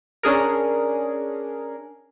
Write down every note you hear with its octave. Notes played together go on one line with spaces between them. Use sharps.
C#4 D4 G#4 A#4